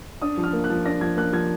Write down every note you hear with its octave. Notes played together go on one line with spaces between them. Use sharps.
D4 D#6
F3
F6
A#3
F#6
F3
D4 A#6
F3 G#6
A#3 F#6
F3 G#6